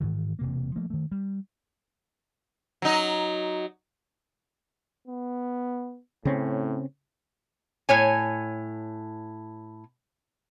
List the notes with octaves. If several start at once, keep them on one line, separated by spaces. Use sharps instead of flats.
G#2 D#3 E3
E1 C3 A#3
F3 A3 A#3
D#3 A3
G3
F#3 D#4
B3
A2 C#3 C4 C#4
A2 C#5 G#5